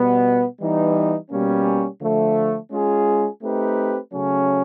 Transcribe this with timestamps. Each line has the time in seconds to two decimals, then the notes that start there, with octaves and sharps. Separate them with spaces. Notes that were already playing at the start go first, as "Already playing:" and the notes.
Already playing: B2 G3 B3
0.59 E3 G3 B3 D#4
1.30 B2 G3 A#3 C#4
2.00 D3 F3 A3
2.71 G#3 C#4 F4 G#4
3.42 A3 C4 D#4 G4 B4
4.13 C#3 F#3 A3 C#4